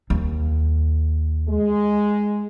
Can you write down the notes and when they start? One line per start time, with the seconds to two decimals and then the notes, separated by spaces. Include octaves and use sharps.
0.10 D#2
1.49 G#3